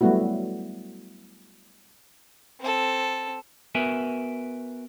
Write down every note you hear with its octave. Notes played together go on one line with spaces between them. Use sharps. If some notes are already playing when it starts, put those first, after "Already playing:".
F#3 G3 A3 B3 E4 F#4
C4 A4
B3 F#4 A#4 B4 E5 G#5